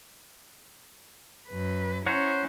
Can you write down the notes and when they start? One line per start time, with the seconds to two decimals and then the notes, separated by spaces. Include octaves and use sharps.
1.49 F#2 B4
2.06 C#4 E4 C5 C#5 F#5 A#5